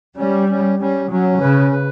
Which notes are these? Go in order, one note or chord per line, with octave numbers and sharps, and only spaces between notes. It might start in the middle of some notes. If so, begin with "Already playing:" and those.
G3 C#4
C#4
G3 C#4
F#3 C#4
C#3 B4
B4